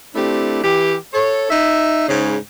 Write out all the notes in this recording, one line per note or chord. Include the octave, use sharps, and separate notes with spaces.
A3 C4 D4 E4 G4
E3 G4
A4 C#5
D#4 E5
G#2 C#3